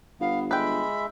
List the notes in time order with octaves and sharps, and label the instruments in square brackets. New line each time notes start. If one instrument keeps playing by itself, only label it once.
[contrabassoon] G1 [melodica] B3 [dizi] F5
[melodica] G#3 E5 [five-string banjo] B4 G5 [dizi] B5